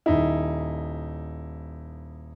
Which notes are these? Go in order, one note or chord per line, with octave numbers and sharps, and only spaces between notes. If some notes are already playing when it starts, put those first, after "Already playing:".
D#1 D#4 E4